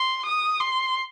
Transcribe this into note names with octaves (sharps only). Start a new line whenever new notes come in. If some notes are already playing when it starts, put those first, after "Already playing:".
Already playing: C6
D#6
C6